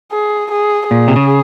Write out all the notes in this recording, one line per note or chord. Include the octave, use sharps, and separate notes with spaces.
G#4
G#4
A#2 G#4
C3
C#3